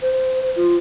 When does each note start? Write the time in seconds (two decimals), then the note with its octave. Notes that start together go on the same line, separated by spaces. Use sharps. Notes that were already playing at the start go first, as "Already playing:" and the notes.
0.02 C5
0.57 F4